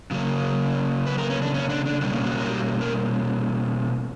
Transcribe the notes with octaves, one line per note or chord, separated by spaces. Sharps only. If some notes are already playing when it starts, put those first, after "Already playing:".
C#3 F#3 A#3 C#4
B4
A#4
C#4
D4
C#4
D4
D4
B2 G3 A#3 C#4 D4
F#4
A#4
G4
A#4